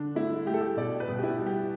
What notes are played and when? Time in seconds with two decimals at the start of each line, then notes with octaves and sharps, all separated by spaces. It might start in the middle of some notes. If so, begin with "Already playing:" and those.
Already playing: D3 D4
0.15 A3 E4
0.46 A3 G4
0.54 A4
0.61 G4
0.77 B2 D5
1.00 B4
1.08 B2
1.19 G4
1.24 E4
1.39 G3
1.46 G4